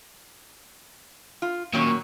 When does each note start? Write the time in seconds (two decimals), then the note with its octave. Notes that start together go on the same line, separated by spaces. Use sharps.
1.42 F4
1.73 A#2 D#3 F#3 C#4